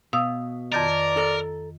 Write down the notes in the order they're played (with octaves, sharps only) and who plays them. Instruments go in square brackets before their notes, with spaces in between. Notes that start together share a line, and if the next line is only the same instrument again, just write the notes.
[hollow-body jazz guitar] B2 [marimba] F5 D#6 E6
[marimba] F2 D#3 A6 [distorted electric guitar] A#4 [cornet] D5
[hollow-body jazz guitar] A4 A#5